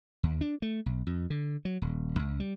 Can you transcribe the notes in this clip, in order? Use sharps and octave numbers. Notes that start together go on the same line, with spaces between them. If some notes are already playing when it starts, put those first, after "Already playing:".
D#2
D4
A3
B1
F2
D3
F#3
D#1
C#2
G3